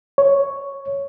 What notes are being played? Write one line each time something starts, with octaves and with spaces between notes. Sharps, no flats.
C#5